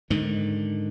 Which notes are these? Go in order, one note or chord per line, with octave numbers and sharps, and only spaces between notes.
G#2 D3 D#3